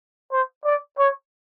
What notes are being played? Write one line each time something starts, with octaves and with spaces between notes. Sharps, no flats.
C5
D5
C#5